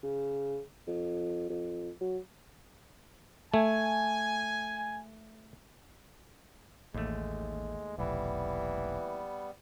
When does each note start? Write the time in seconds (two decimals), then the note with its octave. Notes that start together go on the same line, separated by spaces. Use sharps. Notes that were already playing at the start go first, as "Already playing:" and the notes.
0.03 C#3
0.87 F2
1.50 F2
2.01 F#3
3.54 A3 G#5
6.94 A1 D#2 G#3 A3
7.98 F1 B1 E3 G3 B3